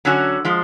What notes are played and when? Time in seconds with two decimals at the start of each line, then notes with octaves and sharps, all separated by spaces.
0.05 D3 F#3 C#4 F#4
0.45 F3 G#3